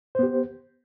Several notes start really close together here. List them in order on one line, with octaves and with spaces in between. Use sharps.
C5 B3 G4